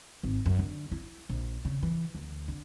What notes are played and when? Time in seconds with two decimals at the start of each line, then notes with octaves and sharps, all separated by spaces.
0.23 G#1
0.46 F#2
0.59 D3
0.92 E4
1.29 A#1
1.65 C#3
1.83 E3
2.15 D2
2.48 D3